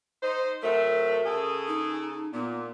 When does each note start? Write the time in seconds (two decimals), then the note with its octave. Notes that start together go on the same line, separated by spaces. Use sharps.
0.22 D#4 C5
0.62 C3 F#3 A3 A#4
1.25 C#3 G#4 A4
1.68 D#4
2.33 A#2 B3